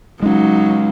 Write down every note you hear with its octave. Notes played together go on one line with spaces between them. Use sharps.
F#3 G#3 C#4 D#4